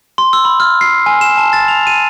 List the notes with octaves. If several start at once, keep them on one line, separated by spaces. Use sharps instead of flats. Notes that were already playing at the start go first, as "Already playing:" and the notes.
C6
E6
B5
F6
C7
G#5
E7
A5
A6
F7
D#7